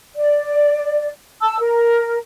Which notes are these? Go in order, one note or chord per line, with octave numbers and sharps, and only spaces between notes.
D5
A5 E6
A#4